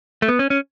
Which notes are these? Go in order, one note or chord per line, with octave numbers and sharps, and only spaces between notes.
A3
B3
C#4
C#4